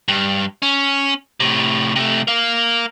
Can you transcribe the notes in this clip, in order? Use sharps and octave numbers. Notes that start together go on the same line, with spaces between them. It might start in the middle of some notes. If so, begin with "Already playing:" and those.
G2
C#4
A2 C3
C3 A3
A#4 F5